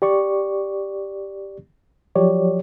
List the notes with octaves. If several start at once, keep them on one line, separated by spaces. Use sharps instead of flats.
G4 D5 C#6
F3 F#3 G4 C#5 D5